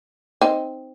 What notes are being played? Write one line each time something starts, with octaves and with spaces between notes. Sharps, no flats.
C4 D#4